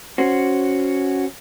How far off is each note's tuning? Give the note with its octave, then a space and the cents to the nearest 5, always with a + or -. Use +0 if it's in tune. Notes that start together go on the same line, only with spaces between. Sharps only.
C#4 +0 F#4 +0 C5 +0